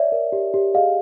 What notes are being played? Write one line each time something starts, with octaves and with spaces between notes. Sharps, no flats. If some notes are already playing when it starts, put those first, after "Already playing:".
Already playing: C#5 D5 E5
A#4
G4
G4
G#4 D#5 F5